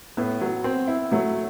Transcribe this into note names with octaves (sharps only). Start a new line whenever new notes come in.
A2 B3
F#3
C4
E4
F#3 A3